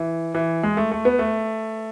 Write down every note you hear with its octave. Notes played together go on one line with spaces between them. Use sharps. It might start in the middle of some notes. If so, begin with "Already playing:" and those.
Already playing: E3
E3
G#3
A3
A3
B3
A3